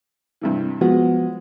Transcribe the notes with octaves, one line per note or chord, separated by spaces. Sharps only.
G2 C3 E3
F3 G#3 B3 F#4